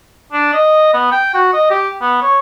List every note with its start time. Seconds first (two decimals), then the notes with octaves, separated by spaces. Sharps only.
0.32 D4
0.54 D#5
0.94 B3
1.12 G5
1.34 F#4
1.53 D#5
1.70 G4
2.01 B3
2.22 C#5